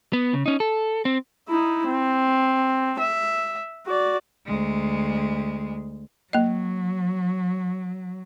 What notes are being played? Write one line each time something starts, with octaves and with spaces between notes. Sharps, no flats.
B3
C#3
C#4 D#4
A4
C4
D#4 E4
C4
E5
F#4 D5
D2 G#3
F#3 A#3 D#5